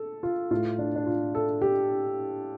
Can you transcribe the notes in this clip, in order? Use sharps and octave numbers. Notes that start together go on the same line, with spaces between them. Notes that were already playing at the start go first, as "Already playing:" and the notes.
Already playing: A4
F4
A2 A3 F4
D4
D4
F4
A4
G4